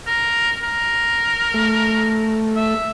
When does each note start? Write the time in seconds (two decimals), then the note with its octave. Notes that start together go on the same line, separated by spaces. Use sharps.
0.06 A#4
0.63 A#4
1.54 A3
2.56 E5